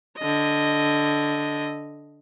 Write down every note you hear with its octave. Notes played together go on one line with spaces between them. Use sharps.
D3 D#5